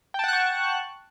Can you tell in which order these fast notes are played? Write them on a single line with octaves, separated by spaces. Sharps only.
G5 A5 F#5 F#6 C#6